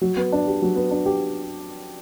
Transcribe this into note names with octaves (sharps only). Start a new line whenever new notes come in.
F#3
B3
D4
G4
F#3
B3
D4
G4